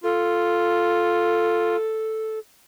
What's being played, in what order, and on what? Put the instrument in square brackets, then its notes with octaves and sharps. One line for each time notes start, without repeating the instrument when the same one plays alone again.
[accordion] F4 [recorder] A4